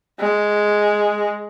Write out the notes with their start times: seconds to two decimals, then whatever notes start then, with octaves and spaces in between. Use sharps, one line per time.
0.20 G#3